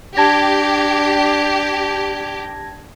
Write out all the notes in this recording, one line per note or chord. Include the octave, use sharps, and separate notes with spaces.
D4 G4 A5 G#6 A#6